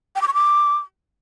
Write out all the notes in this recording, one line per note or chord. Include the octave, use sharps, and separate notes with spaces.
G5
D6
C#6
D6